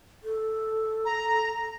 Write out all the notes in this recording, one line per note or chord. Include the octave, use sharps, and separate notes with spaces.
A4
A#5